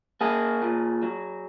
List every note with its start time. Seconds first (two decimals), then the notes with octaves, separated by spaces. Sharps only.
0.21 A#3 G#4
0.62 A#2
1.03 F#3